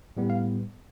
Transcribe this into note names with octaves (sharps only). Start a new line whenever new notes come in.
A2 G3 B3
F5